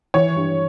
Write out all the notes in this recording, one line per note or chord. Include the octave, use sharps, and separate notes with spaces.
E3 C#5
G2